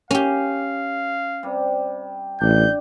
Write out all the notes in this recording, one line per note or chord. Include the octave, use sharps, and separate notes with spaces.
C#4 G4 F5
C3 G3
A1 D4 G6